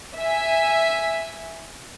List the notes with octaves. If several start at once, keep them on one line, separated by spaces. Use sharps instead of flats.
E5 G#5